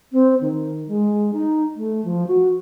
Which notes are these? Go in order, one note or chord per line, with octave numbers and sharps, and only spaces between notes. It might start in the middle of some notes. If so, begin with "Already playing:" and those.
C4
D#3
G#3
D#4
A3
F3
F#4